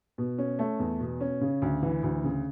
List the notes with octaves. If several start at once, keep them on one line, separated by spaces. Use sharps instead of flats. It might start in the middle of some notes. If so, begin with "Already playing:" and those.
B2
C#4
A3
E2
B2
C#4
C#3
D2
E3
D2
C#3